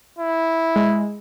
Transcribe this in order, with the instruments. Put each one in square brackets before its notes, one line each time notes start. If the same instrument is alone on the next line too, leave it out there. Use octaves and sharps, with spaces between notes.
[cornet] E4
[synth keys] G#3